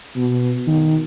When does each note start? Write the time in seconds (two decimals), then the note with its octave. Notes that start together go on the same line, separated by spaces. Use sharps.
0.16 B2
0.67 D#3